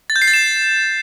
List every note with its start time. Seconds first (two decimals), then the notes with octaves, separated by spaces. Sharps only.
0.10 A6
0.16 G6
0.22 C7
0.28 A6
0.34 E7